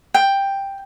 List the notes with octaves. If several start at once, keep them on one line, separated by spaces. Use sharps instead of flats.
G5